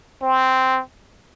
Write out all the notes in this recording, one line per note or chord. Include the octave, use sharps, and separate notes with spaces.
C4